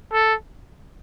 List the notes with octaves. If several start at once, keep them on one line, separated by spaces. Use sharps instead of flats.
A4